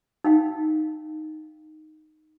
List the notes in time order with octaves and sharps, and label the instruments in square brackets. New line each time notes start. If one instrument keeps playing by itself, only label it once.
[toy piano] D#4 F5 G5